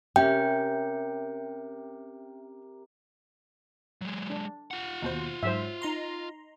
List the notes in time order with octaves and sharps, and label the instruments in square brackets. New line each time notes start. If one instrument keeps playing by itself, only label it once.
[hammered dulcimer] C3 A#4 [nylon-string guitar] C#4 G4 [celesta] E5 [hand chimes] G5
[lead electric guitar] F#3 G#3
[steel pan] D4
[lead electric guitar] F4 F#5
[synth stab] D#2 B2 C5
[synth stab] G#2 F#3 [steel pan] C5 E5
[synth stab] D#4 A#5 C6